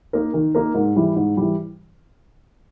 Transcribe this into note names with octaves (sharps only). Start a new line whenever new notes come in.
A#3 D#4 A#4
D#3
A#3 D#4 A#4
G#2
E3 G3
G#2
E3 G3